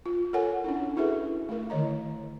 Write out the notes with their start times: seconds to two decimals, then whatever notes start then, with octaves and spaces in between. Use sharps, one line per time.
0.06 F4
0.33 A4 A#4 C#5 F#5 G#5
0.64 C#4 D4 E4
0.97 E4 F#4 G#4 A4 B4 E5
1.49 A3 E4 A#4
1.70 D3 D#3 C#5 D#5 A#5